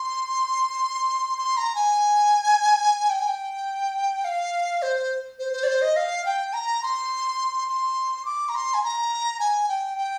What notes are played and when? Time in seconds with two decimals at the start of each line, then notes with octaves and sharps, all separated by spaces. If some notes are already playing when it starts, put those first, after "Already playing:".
Already playing: C6
1.38 C6
1.57 A#5
1.75 G#5
3.10 G5
3.19 G#5
3.28 G5
4.24 F5
4.82 C5
5.39 C5
5.53 C5
5.63 D5
5.67 C5
5.82 D#5
5.96 F5
6.25 G5
6.53 A#5
6.83 C6
7.68 C6
8.25 D6
8.49 A#5
8.55 C6
8.74 G#5
8.84 A#5
9.40 G#5
9.69 G5
9.98 G5